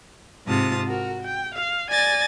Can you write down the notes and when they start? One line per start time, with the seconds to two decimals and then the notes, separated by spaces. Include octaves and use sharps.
0.46 G#2 C3 F4 A5 D#6
0.87 F#4 A#4
1.22 G5
1.54 F5
1.89 D5 G#5 A6 A#6